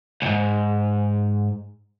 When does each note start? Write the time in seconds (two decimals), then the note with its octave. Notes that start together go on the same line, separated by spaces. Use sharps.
0.22 C#2 G#2